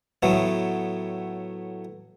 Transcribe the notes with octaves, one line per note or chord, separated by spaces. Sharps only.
A2 F#3 A3 B3